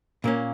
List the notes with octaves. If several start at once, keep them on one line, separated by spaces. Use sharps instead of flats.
A#2 A#3 C#4